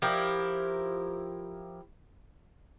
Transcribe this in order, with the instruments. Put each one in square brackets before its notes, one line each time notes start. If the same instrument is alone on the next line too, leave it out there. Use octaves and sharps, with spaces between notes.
[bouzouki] F3 E4 G4 A#4